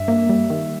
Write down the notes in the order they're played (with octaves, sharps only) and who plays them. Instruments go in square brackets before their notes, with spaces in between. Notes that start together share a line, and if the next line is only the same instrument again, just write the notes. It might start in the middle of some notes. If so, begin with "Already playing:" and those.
Already playing: [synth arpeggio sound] G2 [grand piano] E5
[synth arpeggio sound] A#3
G3
D#3